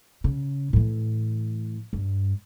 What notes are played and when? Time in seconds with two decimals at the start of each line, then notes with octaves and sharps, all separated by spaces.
0.24 C#3
0.73 A2 E3
1.93 G2